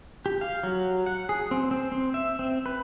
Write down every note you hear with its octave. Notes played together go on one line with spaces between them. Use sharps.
G4
F5
F#3
F#5
G#4
C4
C4
C4
E5
C4
B4